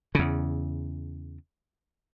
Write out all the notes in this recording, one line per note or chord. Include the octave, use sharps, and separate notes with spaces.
E2 C#3